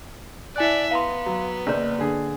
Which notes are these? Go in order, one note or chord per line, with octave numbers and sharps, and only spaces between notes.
E4 D5 E5 G#5 F#6
B3 F5 A#5 C6
F#3
F#1 A#3 D5
D3 G#4